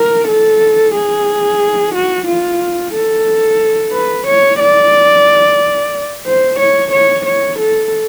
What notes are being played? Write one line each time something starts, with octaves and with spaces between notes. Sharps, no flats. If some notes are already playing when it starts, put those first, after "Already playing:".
Already playing: A#4
A4
G#4
F#4
F4
A4
B4
C#5
D5
C5
C#5
C#5
C#5
A4